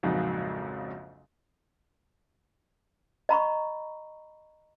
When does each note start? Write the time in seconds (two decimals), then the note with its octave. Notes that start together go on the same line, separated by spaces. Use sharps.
0.03 A#1 F2 G#2 C#3 F#3
3.29 D#5 A#5 B5 C#6